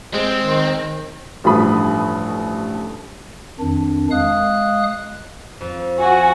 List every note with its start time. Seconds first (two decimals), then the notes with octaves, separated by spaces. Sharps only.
0.14 G#3 C4
0.40 D#3
1.44 A1 G2 F3 A3 B5 D#6
3.60 F2 D#3 D4
4.11 G#3 F5 D#6 F#6
5.61 F2
5.99 F#4 G#5